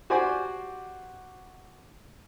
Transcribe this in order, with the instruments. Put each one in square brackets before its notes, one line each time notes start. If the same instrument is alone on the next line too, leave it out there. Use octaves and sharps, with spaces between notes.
[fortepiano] F#4 G4 C5 D5 G#5